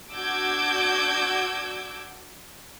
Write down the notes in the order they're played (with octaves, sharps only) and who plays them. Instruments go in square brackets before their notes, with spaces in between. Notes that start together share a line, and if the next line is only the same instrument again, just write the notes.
[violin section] D4 F#4 D6 E6 G6 G#6